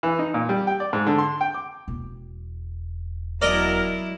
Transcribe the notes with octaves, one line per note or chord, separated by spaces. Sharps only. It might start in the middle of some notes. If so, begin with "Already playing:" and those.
E3
D#4
A#2
G3
G5
D5
G#2
D3
C6
G5
D6
E1
B2 F#3 E4 A#4 D5 D#5